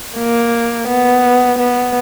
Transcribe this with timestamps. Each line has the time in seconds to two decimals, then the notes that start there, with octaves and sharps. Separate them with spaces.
0.17 A#3
0.88 B3
1.59 B3